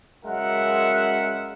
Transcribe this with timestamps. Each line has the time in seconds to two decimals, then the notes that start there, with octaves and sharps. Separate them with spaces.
0.24 F#2 C#3 G#3 A#4 E5 F#5